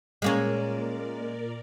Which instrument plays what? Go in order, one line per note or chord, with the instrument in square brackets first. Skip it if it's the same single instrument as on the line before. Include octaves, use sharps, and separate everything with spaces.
[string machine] A#2 A#4 D5 [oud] G#3 A#3 C#4